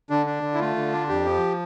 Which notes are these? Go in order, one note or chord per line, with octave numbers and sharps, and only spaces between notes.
D3 D4
D4
D3
E4
A3 F4
D3
D4
F2 G4
F3